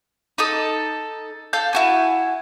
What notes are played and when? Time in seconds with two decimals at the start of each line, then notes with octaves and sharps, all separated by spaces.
0.38 D#4 A4 D#6
1.53 A4 F5 G6
1.73 E4 F#4 G#5